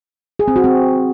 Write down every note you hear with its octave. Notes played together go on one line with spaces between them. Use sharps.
G#4
C4
F#4
C4